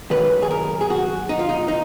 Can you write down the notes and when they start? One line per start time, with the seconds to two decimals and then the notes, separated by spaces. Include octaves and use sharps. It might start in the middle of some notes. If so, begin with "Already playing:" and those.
0.10 F#2 D#3 F#3 A#3 B4
0.42 G#4
0.51 A#4
0.81 G#4
0.90 F#4
1.29 D#4
1.39 F4
1.49 D#4
1.68 D#4